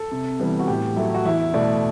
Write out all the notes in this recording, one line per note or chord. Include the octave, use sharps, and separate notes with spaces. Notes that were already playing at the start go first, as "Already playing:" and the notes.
Already playing: A4
C3
E3 G3 B3
F#4
A2 G4
F#3 A3 E4
F#4
E2 E4
B2 A3 D5